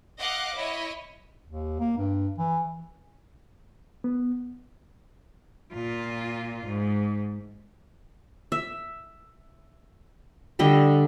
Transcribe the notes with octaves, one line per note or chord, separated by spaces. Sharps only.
D#5 F5 F#5 D6
E4 C#5 D#5
D#2
A#3
G2
E3
B3
A#2 F4
G#2
E5
D3 G3 D#5 E5